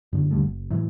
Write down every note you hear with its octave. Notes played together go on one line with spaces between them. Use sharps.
F#2 D3
D#2 D3 G3 A3
F#1
A2 E3 F#3